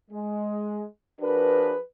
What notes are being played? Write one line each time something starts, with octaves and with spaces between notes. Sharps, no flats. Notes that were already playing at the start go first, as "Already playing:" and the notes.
G#3
F3 D4 F#4 G#4 A#4 B4